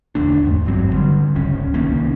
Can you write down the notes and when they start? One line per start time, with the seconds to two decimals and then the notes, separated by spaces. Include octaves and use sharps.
0.15 E1 D2 A3 D4
0.44 E2 G#2
0.65 G#1 G2 F#3 C4
0.93 D3 G3
1.35 D1 G1 C#2 C#4
1.74 C2 D#3 A#3 C#4